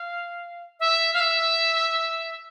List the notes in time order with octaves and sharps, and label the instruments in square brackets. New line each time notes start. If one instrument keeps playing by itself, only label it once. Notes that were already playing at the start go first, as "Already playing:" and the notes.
Already playing: [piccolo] F5
E5
F5
E5